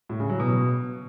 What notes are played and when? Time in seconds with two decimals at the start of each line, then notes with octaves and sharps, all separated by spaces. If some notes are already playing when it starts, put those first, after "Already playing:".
0.09 A2
0.20 C#3
0.30 F#3
0.40 B2